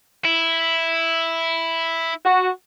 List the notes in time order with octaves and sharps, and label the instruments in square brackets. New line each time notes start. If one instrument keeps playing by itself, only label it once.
[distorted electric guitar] E4
[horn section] F#4